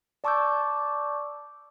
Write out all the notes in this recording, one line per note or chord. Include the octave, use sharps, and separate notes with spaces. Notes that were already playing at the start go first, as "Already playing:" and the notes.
D5 A5 C#6 D6 E6 G6